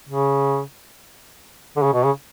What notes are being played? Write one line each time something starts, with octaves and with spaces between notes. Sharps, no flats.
C#3
D3
C#3
B2
C#3